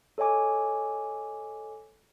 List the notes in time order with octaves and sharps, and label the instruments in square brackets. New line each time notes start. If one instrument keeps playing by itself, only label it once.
[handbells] A4 C#5 D#5 G#5 D6